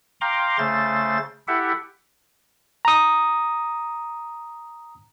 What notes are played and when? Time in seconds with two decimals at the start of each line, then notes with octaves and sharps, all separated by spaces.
0.21 F5 G5 A#5 C6 D6
0.58 C#3 A3 C5 A6
1.48 E4 G4 A4 E5 F#5
2.85 A#5 D#6